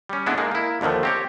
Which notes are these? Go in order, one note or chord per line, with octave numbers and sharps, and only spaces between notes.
G3 C#4
D3 E3 G#3 B3 D4 E4
G#3 A#3 D#4
A#3 E4
D#2 D3 D#3 F3 A3
C4 G4 C#5